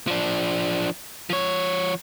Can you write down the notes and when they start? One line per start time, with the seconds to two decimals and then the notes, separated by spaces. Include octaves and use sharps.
0.07 F3 D4
1.30 F3 C#5